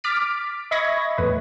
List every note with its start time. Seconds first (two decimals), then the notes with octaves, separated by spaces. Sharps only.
0.04 D6 F6 A6 B6 D7
0.71 D#5 E5 B5 C#6 G#6 A#6
1.18 E2 A2 B4